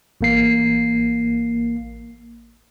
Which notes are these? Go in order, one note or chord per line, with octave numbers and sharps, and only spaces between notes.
A1 A#3 C7